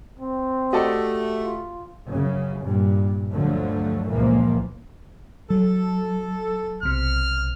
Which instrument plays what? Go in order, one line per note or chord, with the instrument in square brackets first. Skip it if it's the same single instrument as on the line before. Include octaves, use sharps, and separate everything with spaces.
[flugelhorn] C4
[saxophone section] A3 [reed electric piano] F#4 G4 [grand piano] A4 D5 D#5
[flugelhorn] F4
[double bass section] F#2 C#3
G2 A#2
D2 G2 D3 F3 F#3 A3
G1 C#2 A#2 E3 F3 A#3
[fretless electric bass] F#3 [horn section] A4
[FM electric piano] B1 C3 [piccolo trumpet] F6